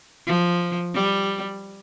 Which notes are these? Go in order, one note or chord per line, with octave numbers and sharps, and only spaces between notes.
F3
G3